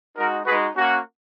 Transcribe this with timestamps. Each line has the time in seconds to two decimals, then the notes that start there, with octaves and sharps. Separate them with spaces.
0.17 G#3 D#4 F#4 A#4
0.45 G#3 D#4 F#4 G#4 B4
0.76 A#3 C#4 F#4